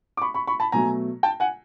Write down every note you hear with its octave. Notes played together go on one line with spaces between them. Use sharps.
D6
B5 C#6
B5 C#6
B5 C#6
A5 B5
B2 F#3 A3 G#5 A#5
G5 A5
F#5 G#5